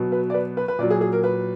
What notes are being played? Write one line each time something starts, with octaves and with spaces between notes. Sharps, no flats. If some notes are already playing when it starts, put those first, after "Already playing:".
Already playing: B2 F#3
B4
D5
B4
B4
B4
A#2 F#3 D5
G#4
G#4
A#4
B4